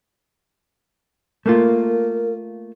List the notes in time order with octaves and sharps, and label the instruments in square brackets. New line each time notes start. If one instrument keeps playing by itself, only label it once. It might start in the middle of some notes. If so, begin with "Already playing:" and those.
[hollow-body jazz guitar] A3 A#3 F4 [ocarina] A#4